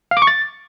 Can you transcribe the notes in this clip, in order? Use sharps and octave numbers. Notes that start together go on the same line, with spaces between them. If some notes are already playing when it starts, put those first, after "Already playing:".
F5
D6
C#6
A6